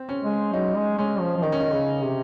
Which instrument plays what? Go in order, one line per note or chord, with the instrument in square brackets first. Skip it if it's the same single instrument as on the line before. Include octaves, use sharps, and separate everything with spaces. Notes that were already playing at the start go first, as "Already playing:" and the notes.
Already playing: [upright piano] C4
C#4
[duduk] G#3
[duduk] F#3 [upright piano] D#4
[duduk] G#3
[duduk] G#3 [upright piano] C#4
[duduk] F3
F3
[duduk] D#3 [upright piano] D#4
[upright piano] C#4
D#4
[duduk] C#3
C3